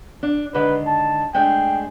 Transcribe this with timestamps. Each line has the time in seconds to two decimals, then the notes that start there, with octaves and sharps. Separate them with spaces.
0.23 D4
0.54 D3 D#3 G#3 B4
0.87 A5
1.35 G#3 A3 D4 G5